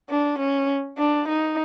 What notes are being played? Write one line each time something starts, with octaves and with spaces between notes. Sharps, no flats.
D4
C#4
D4
D#4